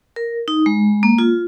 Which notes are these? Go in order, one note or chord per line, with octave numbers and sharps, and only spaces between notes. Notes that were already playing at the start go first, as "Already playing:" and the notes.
A#4
D#4
G#3
A#3
F4